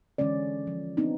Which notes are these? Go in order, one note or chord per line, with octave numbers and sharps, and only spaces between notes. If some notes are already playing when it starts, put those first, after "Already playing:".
D3 E3 G#3 C#4 D5
F3
B3 C4 D4 D#4